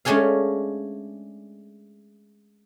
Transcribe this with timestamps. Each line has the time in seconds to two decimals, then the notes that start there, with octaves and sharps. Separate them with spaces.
0.05 G#3 A3 C#4 D4 G#4 F5